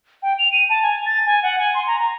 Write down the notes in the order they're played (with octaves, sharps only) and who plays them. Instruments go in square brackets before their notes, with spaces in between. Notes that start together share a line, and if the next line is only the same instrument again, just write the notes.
[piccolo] G5
F7
D#7
A5
G#5
A6
G#5
F#5
G#5
C6
A#5
A#5